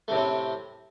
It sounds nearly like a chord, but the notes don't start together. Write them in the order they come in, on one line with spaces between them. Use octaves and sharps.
A3 C3 A2 C4